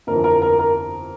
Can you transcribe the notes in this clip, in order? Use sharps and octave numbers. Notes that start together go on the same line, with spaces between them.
G1 F2 E3 A#4
A#4
A#4
A#4